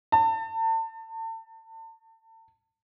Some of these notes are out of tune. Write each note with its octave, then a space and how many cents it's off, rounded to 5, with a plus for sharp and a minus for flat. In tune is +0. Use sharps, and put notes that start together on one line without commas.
A5 +35